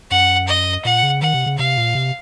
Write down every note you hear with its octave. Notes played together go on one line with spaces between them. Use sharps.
F#2 F#5
D#5
A#2 F#5
C#3
D#3 F#5
C3
C#3
C3 F5
A#2
C3